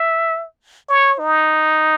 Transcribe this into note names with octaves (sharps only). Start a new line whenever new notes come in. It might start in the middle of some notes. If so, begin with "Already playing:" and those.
Already playing: E5
C#5
D#4